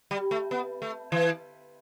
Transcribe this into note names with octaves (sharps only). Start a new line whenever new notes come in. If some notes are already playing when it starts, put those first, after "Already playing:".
G3
A3
B3
A3
E3